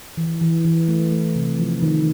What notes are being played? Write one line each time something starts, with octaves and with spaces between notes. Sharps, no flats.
E3
E3
E3
A3
A3
C3
F3
D#3